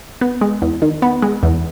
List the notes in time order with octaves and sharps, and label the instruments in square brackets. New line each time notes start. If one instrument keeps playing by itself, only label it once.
[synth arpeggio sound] B3
G#3
E2
D#3
B3
G#3
E2